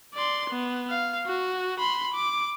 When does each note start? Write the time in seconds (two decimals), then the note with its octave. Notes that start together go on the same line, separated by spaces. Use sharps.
0.14 D5 C6
0.50 B3
0.90 F5
1.26 F#4
1.79 B5 C6
2.14 D6